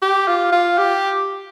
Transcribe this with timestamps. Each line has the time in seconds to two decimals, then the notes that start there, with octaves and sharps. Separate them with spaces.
0.02 G4
0.28 F4
0.52 F4
0.78 G4